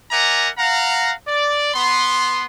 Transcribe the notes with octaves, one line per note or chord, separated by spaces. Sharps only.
A#4 D5 E5 F#5 G#5 A#5
F5 F#5 A#5
D5
B3 C6